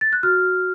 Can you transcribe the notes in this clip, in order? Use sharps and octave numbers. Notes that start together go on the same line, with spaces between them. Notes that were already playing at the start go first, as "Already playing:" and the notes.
A6
F#6
F#4 F6